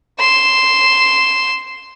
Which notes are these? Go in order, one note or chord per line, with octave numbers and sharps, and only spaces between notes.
C6 E7